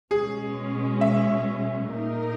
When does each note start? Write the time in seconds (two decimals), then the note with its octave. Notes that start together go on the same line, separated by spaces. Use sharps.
0.11 B2 G#3 C#4 G#4
1.01 E5
1.91 A#2 A#3 D#4 A#4